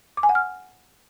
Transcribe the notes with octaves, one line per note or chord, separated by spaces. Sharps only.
D6
G#5
F#5
F6